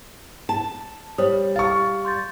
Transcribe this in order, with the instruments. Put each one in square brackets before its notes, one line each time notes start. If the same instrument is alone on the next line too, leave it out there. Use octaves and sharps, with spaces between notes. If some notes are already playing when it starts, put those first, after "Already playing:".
[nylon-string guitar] A5
[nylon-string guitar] G3 [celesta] C5 C#5 D#6
[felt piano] F5 C#6 [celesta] A6
[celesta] C6 G6 A6